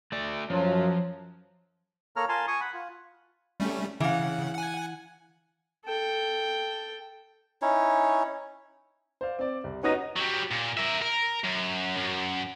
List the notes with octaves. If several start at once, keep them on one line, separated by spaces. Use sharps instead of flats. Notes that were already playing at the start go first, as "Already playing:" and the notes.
A3 D5
F#2 F3 F#3 F4
A#3 A4 A#4 C#5 A#5 F6
F4 A#4 G#5 A5 C6
G#5 C#6 D#6
F#5 B5
F4
G3 A3 C#4
C#3 E3 F5 F#5
F#5 G#5
A4 G5
C#4 D#4 E4 C#5
C5 D5 F5
C4 D5
C2
F#3 B3 C#4 D#4 A#6 D#7
F#3 G3
A#2
A#4 E5
A#4
F#2
F#2